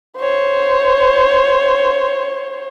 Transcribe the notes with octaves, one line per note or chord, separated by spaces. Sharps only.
C5 C#5